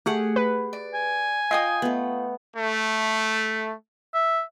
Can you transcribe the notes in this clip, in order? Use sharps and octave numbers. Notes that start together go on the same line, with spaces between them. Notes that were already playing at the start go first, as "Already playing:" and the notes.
A3 G4 G#4 F#5
B4
D5
G#5
F4 D#5 G5 D#6
A3 B3
A3
E5